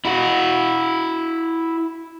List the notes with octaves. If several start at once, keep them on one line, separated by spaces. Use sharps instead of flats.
E4 F#4